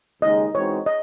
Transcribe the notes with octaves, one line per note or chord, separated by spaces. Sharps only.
D#2 C#3 G#3 D#4 D#5
E3 G#3 C4 D#4 F#4 C#5
D#5